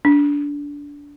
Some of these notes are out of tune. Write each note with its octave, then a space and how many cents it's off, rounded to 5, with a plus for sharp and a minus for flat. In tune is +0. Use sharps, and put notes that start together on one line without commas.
D4 -20